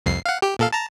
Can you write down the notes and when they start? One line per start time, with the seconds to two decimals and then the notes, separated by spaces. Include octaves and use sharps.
0.06 C2 F2 C7
0.26 F5 F#5
0.42 G4
0.59 A#2 A4 F5
0.73 A5 A#5